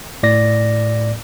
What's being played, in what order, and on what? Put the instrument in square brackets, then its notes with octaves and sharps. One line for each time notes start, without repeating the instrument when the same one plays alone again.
[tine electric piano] A2 D5 A#6